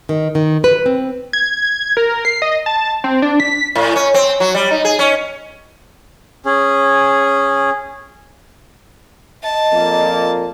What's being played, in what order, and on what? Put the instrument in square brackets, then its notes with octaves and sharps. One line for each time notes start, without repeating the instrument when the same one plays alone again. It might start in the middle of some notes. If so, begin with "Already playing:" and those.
[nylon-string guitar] D#3
D#3
B4
C4
[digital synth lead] G#6
A#4
C7
D#5
A5
C4
D4
B6
[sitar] A2
C#4
C4
F#3
G3
D#4
G#4
C#4
[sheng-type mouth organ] C#4 G#4
[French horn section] D#5 [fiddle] A5
[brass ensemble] F2 A#2 A#3